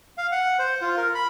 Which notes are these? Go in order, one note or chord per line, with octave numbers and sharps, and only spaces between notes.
F5
F#5
C5
F4
A#4
B5